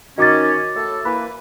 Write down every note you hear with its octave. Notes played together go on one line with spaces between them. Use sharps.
D#3 C#4 F#4 D6 A6
A2 A4
E3 A#3 B4 B5